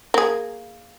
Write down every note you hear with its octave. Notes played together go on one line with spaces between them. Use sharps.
A#3 G#4